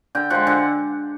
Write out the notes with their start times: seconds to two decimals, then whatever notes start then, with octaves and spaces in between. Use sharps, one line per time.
0.15 D3 G5
0.30 F3 G#3 F#5
0.47 D3 F#5